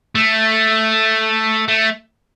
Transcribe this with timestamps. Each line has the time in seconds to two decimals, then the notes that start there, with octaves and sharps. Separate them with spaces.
0.15 A3
1.68 A3